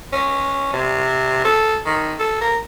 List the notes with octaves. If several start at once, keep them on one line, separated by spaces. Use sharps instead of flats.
C#4
C3
A4
D#3
A4
A#4